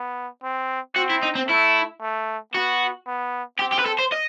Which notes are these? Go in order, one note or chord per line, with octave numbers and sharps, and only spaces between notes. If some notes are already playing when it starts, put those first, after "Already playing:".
Already playing: B3
C4
C4 F#4
E4
D#4
C4
A3 E4
A3
B3 F#4
B3
C4 G4
G4
B4
A4
C5
D#5